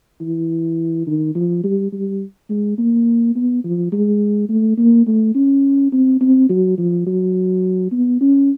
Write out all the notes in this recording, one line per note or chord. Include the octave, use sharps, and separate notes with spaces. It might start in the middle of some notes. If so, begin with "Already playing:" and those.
E3
D#3
F3
G3
G3
G#3
A#3
B3
F3
G#3
A3
A#3
A3
C#4
C4
C4
F#3
F3
F#3
B3
C#4